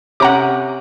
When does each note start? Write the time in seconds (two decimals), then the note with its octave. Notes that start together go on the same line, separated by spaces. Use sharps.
0.20 C3 C#4 F#5 A#5 D6